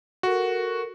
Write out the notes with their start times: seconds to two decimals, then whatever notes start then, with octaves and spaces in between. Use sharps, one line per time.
0.23 F#4 A4 A#4